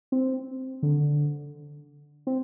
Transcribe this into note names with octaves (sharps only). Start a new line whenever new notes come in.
C4
D3
C4